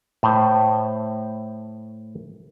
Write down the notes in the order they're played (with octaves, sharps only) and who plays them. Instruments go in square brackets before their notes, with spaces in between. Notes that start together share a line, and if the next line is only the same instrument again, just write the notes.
[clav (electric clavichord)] A2 C5